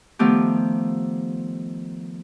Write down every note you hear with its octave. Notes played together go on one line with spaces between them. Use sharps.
D#3 F3 A3 B3 G4